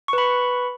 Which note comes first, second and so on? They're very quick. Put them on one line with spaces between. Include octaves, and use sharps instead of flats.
C#6 B4 B5